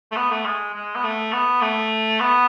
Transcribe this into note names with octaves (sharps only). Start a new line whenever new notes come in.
A3
B3
A3
G#3
G#3
B3
A3
B3
A3
B3